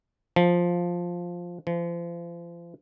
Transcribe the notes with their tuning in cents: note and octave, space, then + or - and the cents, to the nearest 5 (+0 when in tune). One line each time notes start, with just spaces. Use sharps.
F3 +5
F3 -35